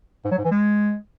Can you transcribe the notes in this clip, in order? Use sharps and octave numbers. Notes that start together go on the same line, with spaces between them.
G#2
F#3
G#2
E3
G#3